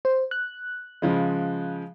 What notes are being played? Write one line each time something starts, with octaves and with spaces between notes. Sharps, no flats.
C5
F#6
C#3 F3 G#3